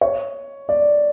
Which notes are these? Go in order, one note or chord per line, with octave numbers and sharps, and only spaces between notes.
C#5
D5